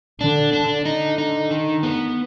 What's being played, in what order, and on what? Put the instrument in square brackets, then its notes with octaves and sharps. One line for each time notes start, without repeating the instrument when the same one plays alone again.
[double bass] D3 [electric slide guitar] D4
[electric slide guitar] D4
[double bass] D3 [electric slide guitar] D#4
[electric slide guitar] D#4
D#3
B3